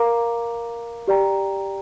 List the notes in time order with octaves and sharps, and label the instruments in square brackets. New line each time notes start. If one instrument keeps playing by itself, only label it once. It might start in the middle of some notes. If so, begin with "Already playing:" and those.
Already playing: [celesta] A#4 F5 A#5 D6
G4 D5 G5 A#5